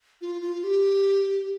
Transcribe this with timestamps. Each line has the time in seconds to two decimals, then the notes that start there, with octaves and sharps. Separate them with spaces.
0.21 F4
0.42 F4
0.64 G4